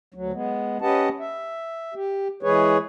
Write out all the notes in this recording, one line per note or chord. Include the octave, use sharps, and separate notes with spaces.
D2 F#3
G#3 B3
C#4 G4 B4 D#5 F#5 A5
E5
G4
E3 G#3 G#4 B4 C#5